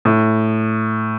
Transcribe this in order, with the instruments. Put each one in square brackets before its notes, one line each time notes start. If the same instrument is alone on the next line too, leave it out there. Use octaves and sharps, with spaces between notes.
[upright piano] A2